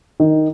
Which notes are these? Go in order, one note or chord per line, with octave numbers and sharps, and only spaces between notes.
D#3